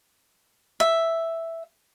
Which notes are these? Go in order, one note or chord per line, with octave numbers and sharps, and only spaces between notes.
E5